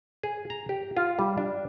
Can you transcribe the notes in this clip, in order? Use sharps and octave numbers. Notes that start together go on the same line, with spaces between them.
G#4
A#5
G4
F4
G3
D4